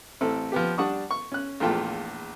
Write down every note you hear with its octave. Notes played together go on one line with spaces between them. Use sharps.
A1 C4 A4
F3 B3 G4
G3 D4 F#5 A5 C#6 D#6
C#6
C#4 F#6
A#1 E2 A3 F4 G5 A5